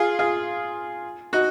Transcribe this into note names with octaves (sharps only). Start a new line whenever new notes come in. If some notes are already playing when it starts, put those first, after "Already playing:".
Already playing: F4 G#4
F4 G#4
D#4 F#4